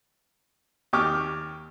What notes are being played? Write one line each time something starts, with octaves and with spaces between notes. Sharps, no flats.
D#2 G4 C#6 D6 F6